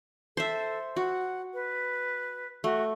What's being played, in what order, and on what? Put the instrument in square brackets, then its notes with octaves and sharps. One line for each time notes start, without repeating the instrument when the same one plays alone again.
[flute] A4 [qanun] C5 E5
[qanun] F#4 [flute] F#5
[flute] B4
[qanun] A3 [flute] F#4